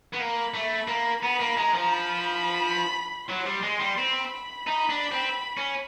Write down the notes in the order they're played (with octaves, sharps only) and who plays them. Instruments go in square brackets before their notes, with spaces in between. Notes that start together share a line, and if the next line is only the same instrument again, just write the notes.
[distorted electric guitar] B3
[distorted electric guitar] A#3 [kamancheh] B5
[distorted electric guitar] A3
A#3
[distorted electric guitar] B3 [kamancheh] B5
[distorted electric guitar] A#3
[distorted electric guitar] G#3 [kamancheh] A#5
[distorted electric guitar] F3
[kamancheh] B5
[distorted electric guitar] F#3 [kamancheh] C6
[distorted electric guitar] G3
G#3
G3
[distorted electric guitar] C4 [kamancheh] B5
[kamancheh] B5
[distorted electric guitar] D#4
D4
C4
C#4